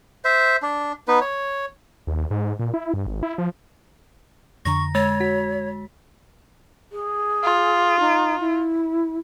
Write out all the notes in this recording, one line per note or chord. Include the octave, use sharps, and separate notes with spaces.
C5 E5
D4
B3 D#4 B4
C#5
D#2
G#2
A#2
E4
G2
G#1
E4
F3
F2 D3 A#5 C#6 A#6
G#3 C#5 A6
F#4 B6
G#4
F4
D#4
E4